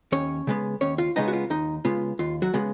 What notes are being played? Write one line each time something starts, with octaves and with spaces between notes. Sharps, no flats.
D#2 C#4 C#5
C#3 G#3 B3
D#2 C#4 C#5
F4 F5
C#3 G#3 B3 D#4 D#5
F#4
F4
D#2 D#4
C#3 G#3 B3 F4
D#2 F4
F#3 F#4
C#3 G#3 B3